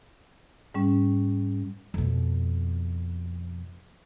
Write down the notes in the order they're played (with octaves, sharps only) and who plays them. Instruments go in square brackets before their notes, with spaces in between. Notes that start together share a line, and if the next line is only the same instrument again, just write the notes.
[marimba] G#2 G3 C#4
[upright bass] F2 B2